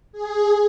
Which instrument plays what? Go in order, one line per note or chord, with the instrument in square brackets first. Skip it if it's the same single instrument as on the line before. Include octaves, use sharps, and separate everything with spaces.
[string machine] G#4